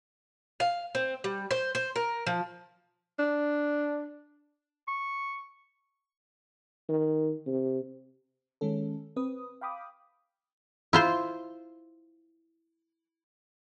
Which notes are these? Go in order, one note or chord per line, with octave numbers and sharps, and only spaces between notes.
F5
C4
G3
C5
C5
A#4
F3
D4
C#6
D#3
C3
D#3 G#3 C#4 A4
C4 B4 D#6
F5 G5 B5 D6 D#6
E4 F4 C5